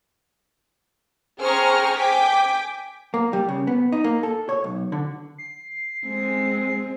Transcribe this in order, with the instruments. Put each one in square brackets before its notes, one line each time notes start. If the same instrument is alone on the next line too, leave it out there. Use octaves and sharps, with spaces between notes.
[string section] G#4 C5 G5 A#5 C#6 F6
G5 G#5 D6 B6
[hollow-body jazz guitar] A#3
G3
C#3
B3
D#4
A#3
A4
C#5
B1
D3
[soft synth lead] C7
[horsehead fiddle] G#3 C4